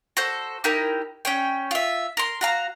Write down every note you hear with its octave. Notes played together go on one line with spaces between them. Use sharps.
F#4 A4 C5
D#4 E4 G4 A#4
C#4 C#5 G5
F4 E5
A#4 C6
F#4 F5 A#5